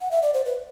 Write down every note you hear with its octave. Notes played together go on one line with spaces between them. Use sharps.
F#5
E5
D5
C5
B4